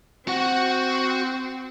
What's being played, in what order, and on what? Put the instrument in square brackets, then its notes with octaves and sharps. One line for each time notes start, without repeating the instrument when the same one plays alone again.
[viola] C4 [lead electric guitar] F#4 F#5